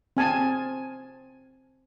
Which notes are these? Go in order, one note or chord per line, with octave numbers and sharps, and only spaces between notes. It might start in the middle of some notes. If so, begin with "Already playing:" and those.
C4 G#5 A5